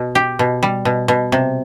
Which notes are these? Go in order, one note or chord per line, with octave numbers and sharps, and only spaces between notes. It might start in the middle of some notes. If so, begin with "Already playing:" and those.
Already playing: B2
G4
B2
G3
B2
B2
C3